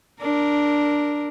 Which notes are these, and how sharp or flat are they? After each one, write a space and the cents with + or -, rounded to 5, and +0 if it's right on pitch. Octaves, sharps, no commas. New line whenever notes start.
D4 +0 A#4 +0